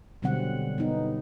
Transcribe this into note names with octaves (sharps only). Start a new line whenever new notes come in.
B2 D3 F#3 G3 C4 F#5
B3 D#4